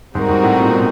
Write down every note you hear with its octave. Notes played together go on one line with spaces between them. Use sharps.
G#2 G3 C4 D#4 F#4 A#4
G#2
A2
A#2
B2